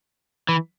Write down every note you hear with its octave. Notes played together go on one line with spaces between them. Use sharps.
E3